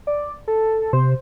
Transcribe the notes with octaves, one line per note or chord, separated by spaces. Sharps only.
D5
A4
C3 C5